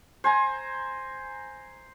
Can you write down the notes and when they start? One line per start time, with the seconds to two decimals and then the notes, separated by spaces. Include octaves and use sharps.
0.24 C5 G#5 A#5